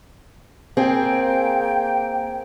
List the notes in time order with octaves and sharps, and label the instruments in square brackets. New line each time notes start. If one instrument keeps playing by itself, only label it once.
[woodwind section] A#3 G5 [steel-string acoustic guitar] C4 G#4